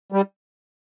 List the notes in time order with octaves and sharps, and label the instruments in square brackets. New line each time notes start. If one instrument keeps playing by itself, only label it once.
[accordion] G3